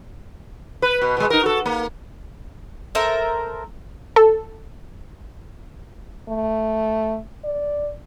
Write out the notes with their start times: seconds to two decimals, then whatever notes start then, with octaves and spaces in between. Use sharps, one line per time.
0.82 B4
1.02 B2
1.17 B2 G#3
1.30 D#4 A#4
1.43 F#4 A4
1.66 A#3
2.95 A4 A#4 C5 E5
4.16 A4
6.28 A3
7.44 D5